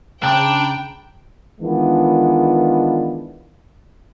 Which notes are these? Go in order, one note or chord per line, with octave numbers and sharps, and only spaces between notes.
C#3 D4 G5 A#5 B5
D#3 E3 G#3 B3 D4 F4